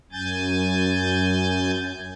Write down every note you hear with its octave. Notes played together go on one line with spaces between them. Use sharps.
F#2 G#5 G6 A6